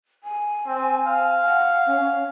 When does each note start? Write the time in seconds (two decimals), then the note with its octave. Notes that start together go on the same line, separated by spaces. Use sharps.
0.24 G#5
0.67 C4
1.07 F5
1.46 F#5
1.86 C#4